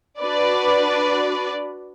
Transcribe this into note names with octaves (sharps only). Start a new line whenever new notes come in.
D4 F#4 B4 D5